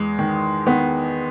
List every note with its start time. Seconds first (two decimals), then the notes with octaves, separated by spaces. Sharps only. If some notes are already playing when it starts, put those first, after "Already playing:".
Already playing: E2 G#3
0.19 D#3
0.66 D#3 B3